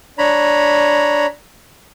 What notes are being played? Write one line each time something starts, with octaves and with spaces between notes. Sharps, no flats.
D4 C#5 A#5 B5